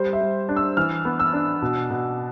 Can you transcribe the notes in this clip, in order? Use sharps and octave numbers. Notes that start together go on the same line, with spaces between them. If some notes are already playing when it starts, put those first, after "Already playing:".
Already playing: G3 C5
E5
G3
D4
E6
E3 F6
B3
E6
D4
B2
B2